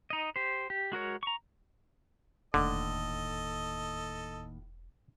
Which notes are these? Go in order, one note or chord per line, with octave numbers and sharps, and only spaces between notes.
D#4 D#5
G4 C5
G4
G#3 F#4 A#4 C#5
A#5 C#6
E1 D#2 A2 D3 A4 D#5